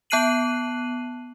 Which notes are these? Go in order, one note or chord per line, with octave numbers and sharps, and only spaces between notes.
B3 A5 F#6 C7 D#7 F#7